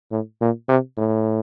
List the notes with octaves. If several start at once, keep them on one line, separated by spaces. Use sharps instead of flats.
A2
A#2
C3
A2